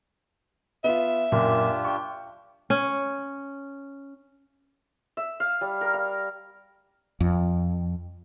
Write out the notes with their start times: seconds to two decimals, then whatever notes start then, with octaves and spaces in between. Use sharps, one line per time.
0.84 B3 F4 E5
1.32 F#2 A#2 A#3 D4 F4 G4
1.85 G5 C#6
2.70 C#4
5.17 E5
5.40 F5
5.61 G3
5.81 A#4
5.94 F5
7.20 F2